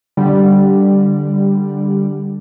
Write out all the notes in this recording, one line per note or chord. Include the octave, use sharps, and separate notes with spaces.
D3 G3